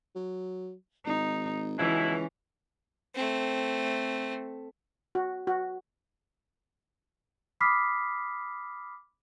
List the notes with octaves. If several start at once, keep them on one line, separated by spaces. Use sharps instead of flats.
F#3
G#1 D#4
C#2 B2 E3 C#4 D#4 E4
A3 C4
F#4
F#4
B5 D6 D#6 F6 B6 C7